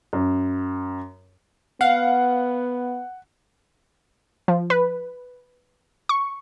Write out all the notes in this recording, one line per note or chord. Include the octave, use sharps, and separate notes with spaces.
F#2
B3 F5 F#5
F3
B4
C#6